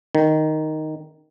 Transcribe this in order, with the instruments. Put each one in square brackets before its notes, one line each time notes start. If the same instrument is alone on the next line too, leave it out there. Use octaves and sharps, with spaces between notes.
[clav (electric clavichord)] D#3